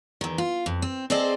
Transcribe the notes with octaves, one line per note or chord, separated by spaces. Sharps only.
E2 D#3
F4
F2
C4
C4 G#4 A4 C5 D5 D#5